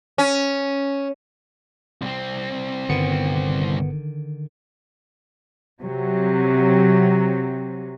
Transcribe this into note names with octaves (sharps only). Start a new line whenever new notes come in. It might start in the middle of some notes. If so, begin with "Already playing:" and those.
C#4
C2 C4
G1 D3 D#3 B3 C#7
C3 F#3